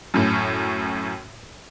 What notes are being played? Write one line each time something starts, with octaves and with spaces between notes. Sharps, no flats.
F#2 A2 C#4